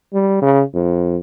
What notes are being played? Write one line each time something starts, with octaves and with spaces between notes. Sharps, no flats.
G3
C#3
F2